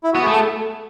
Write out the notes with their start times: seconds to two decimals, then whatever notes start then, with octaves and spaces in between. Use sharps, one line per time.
0.04 E4
0.13 F#4
0.16 B3
0.23 G#4
0.27 A3
0.32 A4